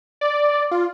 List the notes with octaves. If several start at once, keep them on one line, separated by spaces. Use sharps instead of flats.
D5
F4